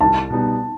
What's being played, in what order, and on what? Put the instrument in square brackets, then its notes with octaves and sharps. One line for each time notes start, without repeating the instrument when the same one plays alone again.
[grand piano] C2 [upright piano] A5
[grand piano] B2 G3 B3 D#4